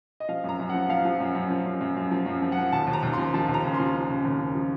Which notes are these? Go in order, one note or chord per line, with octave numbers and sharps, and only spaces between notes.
D#5
F3 F5
F#2 A#5
F#2
F3 F#5
F3 F5
F3
F#2
F#2
F3
F#2
F#2
F#2
F3
F#2
F3
F#5
F3
D#2 A5
D#2
A#5
D#2
F3 C6
F3 A5
D#2
A#5
C#3
C6
F3
F3
C#3
D#2
F3
F3